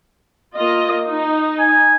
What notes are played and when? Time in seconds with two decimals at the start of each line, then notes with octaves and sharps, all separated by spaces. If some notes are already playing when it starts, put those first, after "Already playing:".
0.55 A#3 F4 D#5
1.10 D#4
1.60 G#5